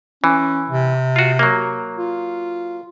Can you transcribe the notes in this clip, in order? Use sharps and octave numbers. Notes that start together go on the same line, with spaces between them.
E3 C#4
C3
F4 F#4
F#3 A#3
F4